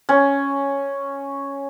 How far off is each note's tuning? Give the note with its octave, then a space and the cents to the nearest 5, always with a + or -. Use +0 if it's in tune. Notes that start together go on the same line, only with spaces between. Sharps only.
C#4 +0